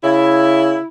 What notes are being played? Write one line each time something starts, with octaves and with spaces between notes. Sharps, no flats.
C#3 E4